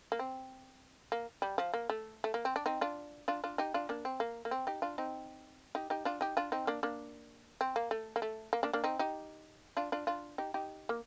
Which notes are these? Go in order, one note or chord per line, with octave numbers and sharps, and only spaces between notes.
A#3
C4
A#3
G3
F3
A#3
A3
A3
A#3
C4
D4
C4 D#4
D4 F4
D4 F4
D4 F4
D#4 G4
D4 F4
A#3 D4
C4
A#3
A#3
C4
D#4 G4
D4 F4
C4 D#4
D#4 G4
D#4 G4
D4 F4
D#4 G4
D4 F4
C4 D#4
A#3 D4
A#3 D4
C4
A#3
A3
A#3
A3
A#3
A#3 D4
A#3 D4
C4 D#4
D#4 G4
D4 F4
D4 F4
D4 F4
D#4 G4
D#4 G4
A#3